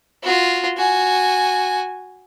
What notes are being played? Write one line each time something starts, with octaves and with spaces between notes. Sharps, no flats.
F4 F#4
F#4 G#5